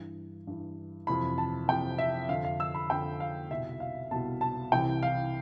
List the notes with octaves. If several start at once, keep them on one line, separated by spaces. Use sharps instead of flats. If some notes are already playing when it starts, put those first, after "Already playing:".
Already playing: G2 E3
G2 E3
F2 C3 E3 B5
A5
F2 C3 E3 G5
E5
F2 D3 F5
F5
E6
B5
F2 D3 G5
F5
C2 B2 E5
F5
C2 B2 A5
A5
C2 C3 E3 G5
F5